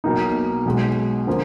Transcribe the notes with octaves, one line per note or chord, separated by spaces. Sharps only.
B1 B2 A#3 D#4
B1 B2 G#3
D3 F3 A#3